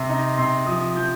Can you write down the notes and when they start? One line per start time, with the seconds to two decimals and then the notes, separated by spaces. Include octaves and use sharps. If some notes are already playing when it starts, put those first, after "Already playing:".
Already playing: C3 C6
0.09 D#4 A#5
0.38 C3 C6
0.66 F3 D#6
0.96 F3 G6